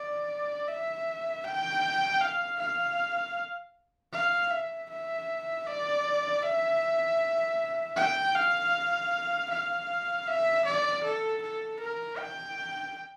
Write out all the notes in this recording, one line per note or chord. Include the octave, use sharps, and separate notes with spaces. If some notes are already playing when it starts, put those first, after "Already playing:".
Already playing: D5
E5
G5
F5
F5
F5
E5
E5
D5
E5
G5
F5
F5
E5
D5
A4
A4
A#4
G5